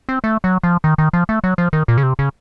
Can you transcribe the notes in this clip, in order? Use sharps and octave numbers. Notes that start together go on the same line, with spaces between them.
C4
A3
F#3
F3
D#3
D#3
F3
A3
F#3
F3
D#3
A#2
C#3
C3
C#3